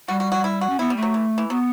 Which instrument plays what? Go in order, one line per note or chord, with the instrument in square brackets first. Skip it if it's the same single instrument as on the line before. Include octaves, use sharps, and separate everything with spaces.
[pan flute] G3 [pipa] F#4
[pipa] F#4
F#4
E4
F#4
[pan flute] C#4
[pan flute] B3 [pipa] E4
[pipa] G3
[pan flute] A3
[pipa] F#3
E3
E3
[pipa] F#3 [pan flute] B3